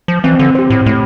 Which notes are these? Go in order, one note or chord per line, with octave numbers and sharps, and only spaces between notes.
F3
E3 C4
D3
G4 C5
A2
A2 A3